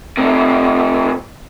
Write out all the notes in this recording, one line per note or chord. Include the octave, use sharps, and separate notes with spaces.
C3 A3